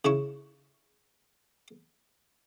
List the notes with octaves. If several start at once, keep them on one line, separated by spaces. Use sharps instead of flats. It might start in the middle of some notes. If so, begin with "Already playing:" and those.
C#3 E4 C#6